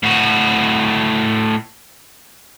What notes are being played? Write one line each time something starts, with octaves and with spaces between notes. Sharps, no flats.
A2 F#4